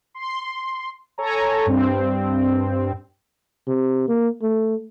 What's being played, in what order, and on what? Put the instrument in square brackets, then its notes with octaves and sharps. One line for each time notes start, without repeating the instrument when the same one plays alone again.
[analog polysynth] C6
A4 C#5 G#5 A#5
G2 C4
[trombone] C3
A#3
A3